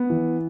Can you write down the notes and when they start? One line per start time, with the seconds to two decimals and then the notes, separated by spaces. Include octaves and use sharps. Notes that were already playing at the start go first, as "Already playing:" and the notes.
Already playing: B3
0.10 E3